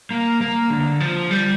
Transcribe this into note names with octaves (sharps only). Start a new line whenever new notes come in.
A#3
A#3
D3
F3
G3